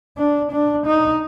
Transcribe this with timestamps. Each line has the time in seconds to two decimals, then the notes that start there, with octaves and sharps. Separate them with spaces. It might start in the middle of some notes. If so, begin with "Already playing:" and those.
0.17 D4
0.51 D4
0.86 D#4